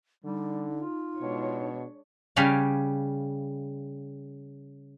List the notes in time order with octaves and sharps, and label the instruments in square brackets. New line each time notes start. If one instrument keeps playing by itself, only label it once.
[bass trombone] D3 [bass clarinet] G3 [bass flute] D#4
[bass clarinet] F4
[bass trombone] B2 [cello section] G#3 D4 C#5
[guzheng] C#3 G3 G4 C#5 F5 B5